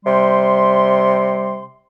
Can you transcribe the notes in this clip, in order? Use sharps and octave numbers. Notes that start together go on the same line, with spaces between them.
C3 G3 C6